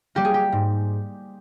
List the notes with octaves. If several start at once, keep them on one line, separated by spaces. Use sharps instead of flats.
G3 A#3 G4
G#4
G4
G#2